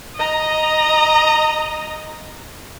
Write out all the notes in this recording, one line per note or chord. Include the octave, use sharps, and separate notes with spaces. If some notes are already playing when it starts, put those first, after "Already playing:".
D#5 A#5